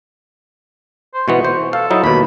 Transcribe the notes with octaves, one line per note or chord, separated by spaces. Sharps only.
C5
B2 E3 B3 C#6
C5
A4 F5
F#3 D#4 E4
D#2 B2 B5